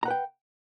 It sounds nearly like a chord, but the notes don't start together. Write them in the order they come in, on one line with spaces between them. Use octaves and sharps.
A#5 F#5 B4 G5